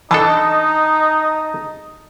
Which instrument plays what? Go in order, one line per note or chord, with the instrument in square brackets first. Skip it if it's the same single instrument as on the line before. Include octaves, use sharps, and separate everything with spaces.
[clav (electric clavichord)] E3 D4 A4 [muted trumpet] D#4 [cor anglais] D#5 [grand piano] A5